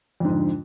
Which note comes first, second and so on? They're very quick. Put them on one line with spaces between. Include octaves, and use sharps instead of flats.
F2 G#2 D3